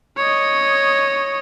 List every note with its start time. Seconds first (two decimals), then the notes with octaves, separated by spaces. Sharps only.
0.17 C#5 D#5